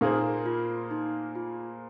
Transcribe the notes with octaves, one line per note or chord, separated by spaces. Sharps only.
A#2 A#3 D#4 G#4 C5
F4
D#4
F4